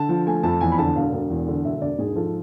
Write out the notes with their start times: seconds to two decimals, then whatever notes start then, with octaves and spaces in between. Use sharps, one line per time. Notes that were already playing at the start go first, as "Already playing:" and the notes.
Already playing: D3 A5
0.09 F3
0.27 A3 G#5
0.43 F2 A5
0.61 E2 G#5
0.72 B5
0.78 D3 A5
0.96 E1 F5
1.13 E1
1.30 E2
1.47 D3
1.65 E1 E5
1.82 E1 D5
1.98 G#2 G#4
2.15 F3 A4